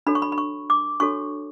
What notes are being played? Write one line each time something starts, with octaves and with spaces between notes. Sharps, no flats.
D4 F#4 A4 C#5 B5
C#6
B5
B5
C#6
D6
D4 F#4 A4 C#5 C#6